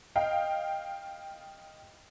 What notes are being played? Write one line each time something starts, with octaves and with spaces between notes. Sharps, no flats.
D#5 F5 G5